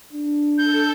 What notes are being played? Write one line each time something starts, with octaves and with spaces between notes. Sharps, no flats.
D4
A4 G6